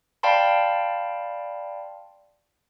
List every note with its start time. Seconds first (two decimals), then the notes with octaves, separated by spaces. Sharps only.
0.23 D5 F5 G5 A5 B5 C6